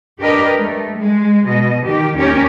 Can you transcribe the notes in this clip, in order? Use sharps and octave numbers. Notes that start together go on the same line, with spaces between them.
D4 G4 A#4 B4 D#5
A3
G#3
B2 D#5
D#3 G4
D#2 C#4 G4 A#4